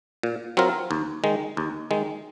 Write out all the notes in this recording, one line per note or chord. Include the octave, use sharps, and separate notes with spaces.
A#2
F#3 C4 F4 A#4
D#2
D#3 G#3
D#2
D#3 G#3